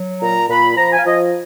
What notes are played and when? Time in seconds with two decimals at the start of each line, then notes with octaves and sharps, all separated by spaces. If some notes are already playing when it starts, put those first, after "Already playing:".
Already playing: F#3
0.21 A#2 A#5
0.49 A#2 B5
0.77 F3 A#5
0.91 G#5
0.98 F5
1.05 F3 D#5